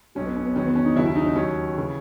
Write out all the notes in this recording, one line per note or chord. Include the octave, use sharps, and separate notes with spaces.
B1 B2 F#3 C#4
B3
C#4
B3
E2 D#3 F#3 C#4
B3
C#4
D#4
D#2 C#3 F#3 E4
E4
D#4
D#4
D#2 D#3 F#3 C#4
C#3 E3